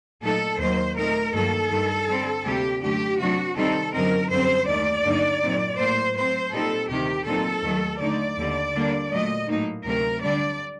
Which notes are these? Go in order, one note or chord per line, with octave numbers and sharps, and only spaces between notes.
A#2 F#3 A3 D#4 A4
D#2 D#3 F#3 A#3 C5
A#2 A3 C4 D#4 A#4
G2 D#3 F#3 A#3 A4
G2 D#3 G3
D3 G3 C4
D2 C3 G3 A#3 G4
F#2 D3 A3 G4
C3 F#3 A3 D4 F#4
C3 D#3 G3 C4 D#4 A4
F#2 D3 F#3 C4 D#4 A#4
F#2 D3 G3 C4 C5
D#2 D#3 A3 D#4 D5
G2 D3 F#3 A#3 D#4
A#2 F#3 C4 D#4
A2 F#3 A#3 C5
A2 F#3 C4 C5
A#2 G3 C4 D#4 A4
D2 C3 D#3 G4
A#2 F#3 C4 D#4 A4
D#2 D#3 F#3 A3
D3 A3 D#4 D5
D#2 D3 G3
D3 G3 A#3 D4
A#2 F#3 A3 D#5
A2 F#3 A#3 D#4
D2 C3 F#3 A3 C4 A#4
D3 G3 D4 D5